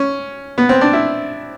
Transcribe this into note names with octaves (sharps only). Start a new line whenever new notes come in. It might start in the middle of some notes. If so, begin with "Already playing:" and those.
Already playing: C#4
B3
C4
D4
E4